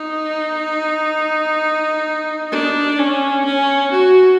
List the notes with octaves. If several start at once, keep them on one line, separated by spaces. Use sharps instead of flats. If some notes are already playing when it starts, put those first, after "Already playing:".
Already playing: D#4
D4
C#4
C#4
F#4